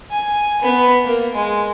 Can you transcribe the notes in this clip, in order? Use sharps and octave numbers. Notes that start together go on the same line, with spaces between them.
G#5
B3
A#3
G#3